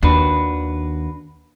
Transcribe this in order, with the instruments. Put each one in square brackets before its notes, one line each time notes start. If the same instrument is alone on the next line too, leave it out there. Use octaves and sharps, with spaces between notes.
[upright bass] D#2 [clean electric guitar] D4 F#4 B4